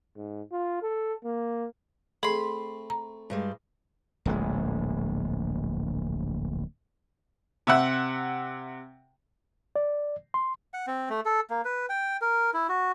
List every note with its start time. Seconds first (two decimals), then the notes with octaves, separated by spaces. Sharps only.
0.16 G#2
0.52 F4
0.82 A4
1.24 A#3
2.23 A3 C4 G#4 B5 C6
2.90 A#5
3.30 G2 G3 G#3
4.25 D1 A#1 G#3
7.67 C3 E5 F#5
9.76 D5
10.34 C6
10.74 F#5
10.87 C4
11.10 A3
11.26 A4
11.50 A#3
11.65 B4
11.89 G5
12.21 A#4
12.54 E4
12.69 F#4